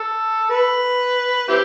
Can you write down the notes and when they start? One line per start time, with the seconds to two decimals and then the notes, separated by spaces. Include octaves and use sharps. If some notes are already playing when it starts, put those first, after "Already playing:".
Already playing: A4
0.50 B4
1.48 C4 E4 G4